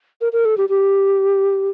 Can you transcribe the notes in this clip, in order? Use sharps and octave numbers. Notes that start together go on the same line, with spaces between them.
A#4
A#4
A4
G4
G4